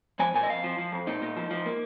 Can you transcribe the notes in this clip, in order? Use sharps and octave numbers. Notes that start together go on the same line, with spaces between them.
F3 G#5
A#2 G#5
D#5
F2 F5
F3
F3
F2
A#2 D#4
A#2
F3
F3
A#3